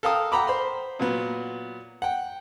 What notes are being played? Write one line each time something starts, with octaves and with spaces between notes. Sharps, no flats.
A4 A#4 F5 G5 D#6
F#5 G5 A#5 B5 D6
C5 B5 C6
A#2 F#3 B3
F#5 G5